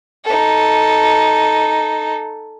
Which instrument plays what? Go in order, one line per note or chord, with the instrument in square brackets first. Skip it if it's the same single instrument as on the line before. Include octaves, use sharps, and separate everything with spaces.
[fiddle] D#4 A4